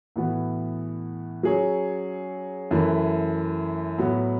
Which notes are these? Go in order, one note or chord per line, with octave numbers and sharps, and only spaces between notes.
A2 E3 B3 F#4
F#3 C#4 G#4 C#5
F#2 E3 A3 E4
A2 F#3 B3